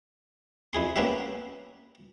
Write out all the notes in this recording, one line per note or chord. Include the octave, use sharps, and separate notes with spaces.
F2 E4 G#4 C6
A#3 B3 C#4 D4 G4 E5